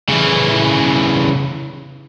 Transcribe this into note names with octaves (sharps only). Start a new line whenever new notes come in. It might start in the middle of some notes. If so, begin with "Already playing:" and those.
C#3 E3